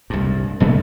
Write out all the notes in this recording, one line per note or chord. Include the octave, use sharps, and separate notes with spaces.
C2 G2
C2 A#2 A3 B3